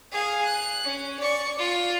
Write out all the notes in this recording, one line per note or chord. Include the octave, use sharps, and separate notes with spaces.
G#4 F5
F#6
C#4
D5 C#6
F4